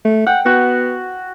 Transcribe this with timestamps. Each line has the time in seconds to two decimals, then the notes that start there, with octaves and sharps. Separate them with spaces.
0.05 A3
0.27 F#5 G5
0.46 B3 F#4